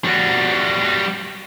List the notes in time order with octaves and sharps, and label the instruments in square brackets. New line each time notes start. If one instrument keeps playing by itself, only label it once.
[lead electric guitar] G3 F#4